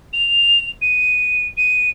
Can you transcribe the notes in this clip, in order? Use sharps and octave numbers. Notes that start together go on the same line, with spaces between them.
F7
D#7
D#7